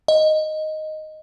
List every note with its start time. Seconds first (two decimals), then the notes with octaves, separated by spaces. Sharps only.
0.08 D#5